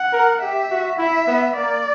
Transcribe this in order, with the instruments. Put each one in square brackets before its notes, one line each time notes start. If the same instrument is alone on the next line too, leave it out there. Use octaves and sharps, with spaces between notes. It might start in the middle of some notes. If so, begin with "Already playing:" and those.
Already playing: [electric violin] F#5
[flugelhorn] A#4
[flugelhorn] G4 [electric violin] E5
[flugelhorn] F#4
[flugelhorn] E4 [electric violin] E5
[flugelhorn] B3
[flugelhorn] A#3 [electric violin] D5